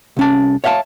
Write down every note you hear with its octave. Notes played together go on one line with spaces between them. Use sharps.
C2 C#4 A5
C#5 E5 F5 G5 A5